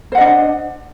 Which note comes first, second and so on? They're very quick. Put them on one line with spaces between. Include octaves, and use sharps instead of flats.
C5 F#5 D#5 D4